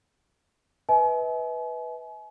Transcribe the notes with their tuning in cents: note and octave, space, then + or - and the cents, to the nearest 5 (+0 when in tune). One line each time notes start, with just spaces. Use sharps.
B4 +0 E5 -45 G#5 +40